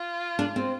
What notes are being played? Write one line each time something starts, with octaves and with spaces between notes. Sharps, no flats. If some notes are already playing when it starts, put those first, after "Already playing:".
Already playing: F4
D4
C4